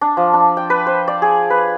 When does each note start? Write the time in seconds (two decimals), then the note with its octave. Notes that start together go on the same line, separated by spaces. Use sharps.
0.01 D4
0.17 F3
0.34 D4
0.57 G5
0.70 B4
0.87 C5
1.08 D5
1.22 G#4
1.50 B4